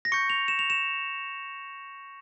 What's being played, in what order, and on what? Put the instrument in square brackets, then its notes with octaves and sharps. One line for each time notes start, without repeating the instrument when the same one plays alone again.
[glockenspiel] A#6
C#6 G6 C#7
F7
E7
F7
E7